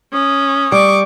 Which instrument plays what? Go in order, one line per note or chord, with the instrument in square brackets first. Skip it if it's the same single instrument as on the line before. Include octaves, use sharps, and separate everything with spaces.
[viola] C#4 [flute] D#6
[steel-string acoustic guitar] G3 [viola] C#6 D6